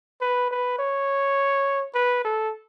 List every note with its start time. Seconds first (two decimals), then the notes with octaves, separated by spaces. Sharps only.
0.21 B4
0.51 B4
0.79 C#5
1.94 B4
2.24 A4